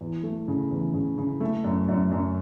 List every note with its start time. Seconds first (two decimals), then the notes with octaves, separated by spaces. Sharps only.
0.01 E2
0.23 A3
0.48 C#3
0.71 E2
0.94 C#3
1.18 C#3
1.41 A3
1.64 F#2
1.88 F#2
2.11 F#2